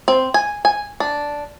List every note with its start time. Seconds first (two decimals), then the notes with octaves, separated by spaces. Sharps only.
0.08 C4
0.34 G#5
0.65 G#5
1.00 D4